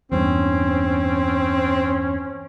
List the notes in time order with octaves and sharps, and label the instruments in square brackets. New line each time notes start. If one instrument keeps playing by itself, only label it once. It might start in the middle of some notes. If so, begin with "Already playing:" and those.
[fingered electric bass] E2 G2 [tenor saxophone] C4 [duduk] C#4